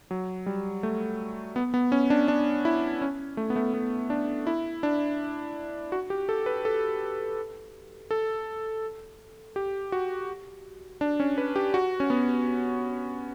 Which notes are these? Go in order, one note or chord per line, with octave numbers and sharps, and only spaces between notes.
F#3
G3
A3
B3
B3
C#4
D4
D4
E4
C#4
A3
B3
A3
B3
D4
E4
D4
F#4
G4
A4
B4
A4
A4
G4
F#4
D4
C#4
B4
G4
F#4
C#4
B3